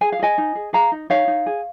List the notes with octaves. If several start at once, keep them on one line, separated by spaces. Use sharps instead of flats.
G#4 G#5
F5
G#4 D#5 G#5
D#4
G#4
G#4 F5 A#5
D#4
D#4 C#5 F5
D#4
G#4